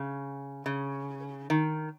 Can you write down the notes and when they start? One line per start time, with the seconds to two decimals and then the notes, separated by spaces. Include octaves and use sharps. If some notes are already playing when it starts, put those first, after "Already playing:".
Already playing: C#3
0.66 C#3
1.50 D#3